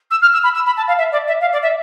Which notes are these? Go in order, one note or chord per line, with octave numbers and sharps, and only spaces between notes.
E6
F6
E6
B5
E6
B5
A5
F5
E5
D5
E5
F5
D5
E5